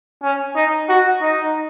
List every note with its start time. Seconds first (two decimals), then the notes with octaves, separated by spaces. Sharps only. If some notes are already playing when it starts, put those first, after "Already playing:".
0.23 C#4
0.56 D#4
0.89 F#4
1.22 D#4